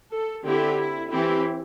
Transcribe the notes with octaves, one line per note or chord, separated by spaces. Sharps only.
A4
D3 C4 E4 G4
E4
E3 C4 E4 G4